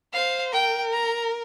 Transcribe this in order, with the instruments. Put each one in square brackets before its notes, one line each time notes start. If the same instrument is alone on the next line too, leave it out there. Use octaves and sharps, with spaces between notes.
[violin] C5 [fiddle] F5
[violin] A#4 [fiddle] G5
[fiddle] A#5